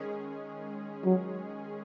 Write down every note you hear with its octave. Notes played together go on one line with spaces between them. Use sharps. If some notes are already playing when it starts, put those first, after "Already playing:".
Already playing: D#3 G#3 C#4 G#4
F#3